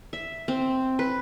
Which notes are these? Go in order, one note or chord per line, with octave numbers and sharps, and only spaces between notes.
E5
C4
B4